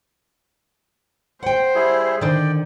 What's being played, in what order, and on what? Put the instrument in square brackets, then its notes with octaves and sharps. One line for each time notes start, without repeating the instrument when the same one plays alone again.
[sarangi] C5 [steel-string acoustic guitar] F#5 G5
[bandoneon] G3 E4 G#4
[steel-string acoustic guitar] D3 D#3 [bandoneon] D5 G5